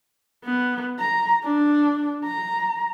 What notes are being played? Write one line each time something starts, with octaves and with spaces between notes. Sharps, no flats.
B3
A#5
D4
A#5